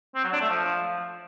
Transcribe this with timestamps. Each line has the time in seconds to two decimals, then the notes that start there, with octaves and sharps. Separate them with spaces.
0.16 C4
0.24 F#3
0.33 D4
0.41 A3
0.50 F3